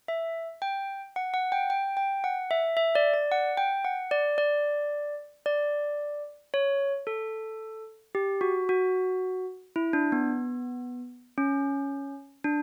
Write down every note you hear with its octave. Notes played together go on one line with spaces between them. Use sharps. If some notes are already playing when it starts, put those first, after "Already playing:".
E5
G5
F#5
F#5
G5
G5
G5
F#5
E5
E5
D5
D5
F#5
G5
F#5
D5
D5
D5
C#5
A4
G4
F#4
F#4
E4
D4
B3
C#4
D4